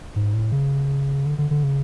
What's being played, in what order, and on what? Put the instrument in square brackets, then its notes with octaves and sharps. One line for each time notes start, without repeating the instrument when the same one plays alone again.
[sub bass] G#2
A2
C#3
D3
D3
D3
C#3